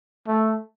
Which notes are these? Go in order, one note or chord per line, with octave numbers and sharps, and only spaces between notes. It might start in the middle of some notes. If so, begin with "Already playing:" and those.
A3